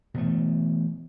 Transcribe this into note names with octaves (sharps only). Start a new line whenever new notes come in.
B2 E3 A3